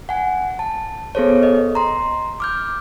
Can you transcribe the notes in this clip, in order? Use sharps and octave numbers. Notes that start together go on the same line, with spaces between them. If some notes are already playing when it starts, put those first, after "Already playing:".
F#5 G#5
A5
B3 G#4 A4 C5 C#5
D#5
A#5 C6
D6 F6 G6